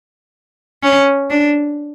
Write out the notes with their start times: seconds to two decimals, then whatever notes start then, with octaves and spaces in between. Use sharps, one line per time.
0.83 C#4
1.30 D4